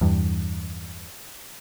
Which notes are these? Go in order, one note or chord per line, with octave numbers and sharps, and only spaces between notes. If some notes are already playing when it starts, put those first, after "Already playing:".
E2 G2